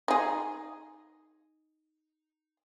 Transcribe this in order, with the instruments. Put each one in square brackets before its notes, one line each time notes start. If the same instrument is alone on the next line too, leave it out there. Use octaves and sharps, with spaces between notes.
[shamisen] D#4 G#4